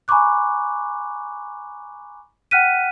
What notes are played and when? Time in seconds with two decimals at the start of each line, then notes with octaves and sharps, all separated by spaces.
0.08 G#5 A#5 B5 C#6 D6 F#6
2.51 F#5 G5 F6 F#6 B6 D#7